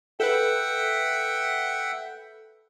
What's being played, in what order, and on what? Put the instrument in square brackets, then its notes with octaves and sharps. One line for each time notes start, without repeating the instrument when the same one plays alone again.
[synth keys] A4 B4 [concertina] E5 F#5 G5